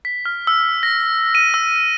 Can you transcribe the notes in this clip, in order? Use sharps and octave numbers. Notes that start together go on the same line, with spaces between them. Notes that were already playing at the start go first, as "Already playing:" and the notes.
B6
F6
E6
A#6
D#7
E6